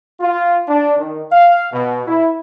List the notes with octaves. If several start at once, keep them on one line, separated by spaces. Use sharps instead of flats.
F4
D4
D#3
F5
B2
E4